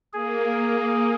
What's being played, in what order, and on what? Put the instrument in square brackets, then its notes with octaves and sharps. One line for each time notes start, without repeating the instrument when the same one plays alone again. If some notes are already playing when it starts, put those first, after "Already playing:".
[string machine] A#3 [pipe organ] G#4